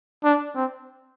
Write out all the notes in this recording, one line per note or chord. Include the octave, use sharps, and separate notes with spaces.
D4
C4